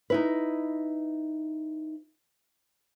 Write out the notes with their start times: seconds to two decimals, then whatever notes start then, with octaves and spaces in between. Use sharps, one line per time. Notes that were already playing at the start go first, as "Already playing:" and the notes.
0.10 D#4 E4 B4